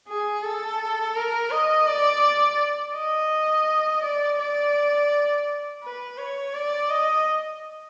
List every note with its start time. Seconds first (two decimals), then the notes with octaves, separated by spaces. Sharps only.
0.08 G#4
0.43 A4
1.15 A#4
1.51 D#5
1.88 D5
2.95 D#5
4.03 D5
4.39 D5
5.82 B4
6.18 C#5
6.54 D5
6.90 D#5